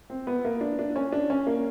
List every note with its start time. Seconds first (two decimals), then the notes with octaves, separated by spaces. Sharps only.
0.10 C4
0.27 B3
0.45 A#3
0.61 D4
0.79 D4
0.96 C#4
1.12 D4
1.30 C#4
1.47 A#3